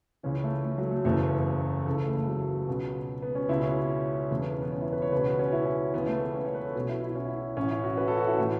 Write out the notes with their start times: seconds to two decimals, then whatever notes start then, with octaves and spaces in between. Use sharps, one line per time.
0.23 C#2 C#3 E3 C#4
0.44 A3
0.64 A3
0.78 F#3
0.91 A3
1.05 F#1 E2 C#3 E3 A3
1.86 C#2 C#3 E3 A4
2.07 A3
2.17 A3
2.27 F#3
2.68 C#2 B2
3.22 B3
3.35 C#4
3.49 C#2 B2 E4
3.63 C#4
4.31 E1 E2 C#3 A3
4.41 B3
4.51 C#4
4.62 B3
4.72 C#4
4.82 E4
4.93 B4
5.02 C#5
5.12 C#2 B2 B4
5.26 F#4
5.39 C#4
5.52 E4
5.65 C#4
5.94 C#2 C#3 E3 B3
6.07 A3
6.21 B3
6.34 C#4
6.45 C#5
6.55 B4
6.65 A4
6.75 B1 B2 F#4
6.89 E4
7.03 E4
7.15 C#4
7.28 E4
7.57 A1 A2 E3 C#4
7.71 E4
7.84 F#4
7.97 B4
8.08 A4
8.17 F#4
8.28 E4
8.38 A2 E3 A3